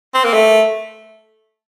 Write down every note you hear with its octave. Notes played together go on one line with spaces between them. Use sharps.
C4
A#3
A3